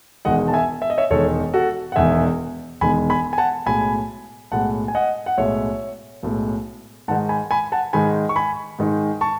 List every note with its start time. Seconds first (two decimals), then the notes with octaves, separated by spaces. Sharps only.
0.25 E1 E2 D#3 G#3 D#5 F#5
0.48 A5
0.53 E5 G#5
0.82 E5
0.90 D#5
0.98 C#5 E5
1.10 E1 E2 D#3 G#3 A4 C#5
1.54 F#4 A4
1.92 F#5
1.96 E1 E2 D#3 G#3 E5 G#5
2.81 E1 E2 D#3 G#3 G#5 B5
3.10 G#5 B5
3.33 G#5
3.38 F#5 A5
3.66 B1 A2 G#3 G#5 B5
4.52 B1 A2 G#3 F#5 A5
4.88 G#5
4.95 D#5 F#5
5.26 F#5
5.38 B1 A2 G#3 C#5 E5
6.23 B1 A2 G#3
7.08 G#2 D#3 G#3 D#4 F#5 A5
7.29 G#5 B5
7.51 G#5 B5
7.72 F#5 A5
7.93 G#2 D#3 G#3 D#4 G#5 B5
8.29 C#6
8.36 G#5 B5
8.79 G#2 D#3 G#3 D#4
9.21 A5 C#6